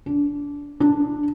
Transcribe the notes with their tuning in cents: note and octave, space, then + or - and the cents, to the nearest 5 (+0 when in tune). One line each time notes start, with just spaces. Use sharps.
D4 -20
D4 +5